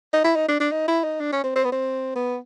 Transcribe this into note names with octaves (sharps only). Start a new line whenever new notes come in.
D#4
E4
D#4
D4
D4
D#4
E4
D#4
D4
C#4
C4
C4
B3
C4
B3